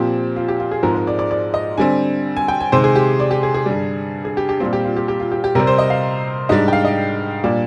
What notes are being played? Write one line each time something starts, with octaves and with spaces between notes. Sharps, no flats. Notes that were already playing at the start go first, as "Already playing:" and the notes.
Already playing: A#2 F3 C4 G4
F4
G4
F4
G#4
G#2 F3 G#3 C4 A#4
A#4
D5
D5
D5
D#5
D3 G3 C4 G#5
G#5
G5
G#5
C3 D#3 G#3 C5
G#4
G4
D5
G4
G#4
G#4
G2 D3 G3
G#4
G4
G4
A#2 G3 C4 F4
G4
F4
G4
G4
F4
G4
G4
C3 G3 C4 A#4
C5
D#5
F5
G#2 G3 D4 D#5
G5
F5
D#5
A#2 G3 D4 D5